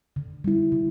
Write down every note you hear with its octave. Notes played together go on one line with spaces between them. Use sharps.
D3
G3 E4
D3